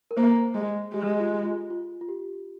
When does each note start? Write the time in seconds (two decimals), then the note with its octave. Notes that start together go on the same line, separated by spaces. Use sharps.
0.11 A#4
0.17 A#3 C5
0.55 G#3 G#4
0.94 G#3 G4
1.20 F4
1.45 F4
1.70 F4
2.01 F4
2.09 G4